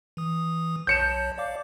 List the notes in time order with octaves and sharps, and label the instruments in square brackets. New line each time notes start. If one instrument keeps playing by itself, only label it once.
[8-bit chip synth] E3 D#6
[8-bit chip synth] B1 C#5 A5 [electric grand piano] G6 C#7 E7
[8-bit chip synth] D5 F5 D6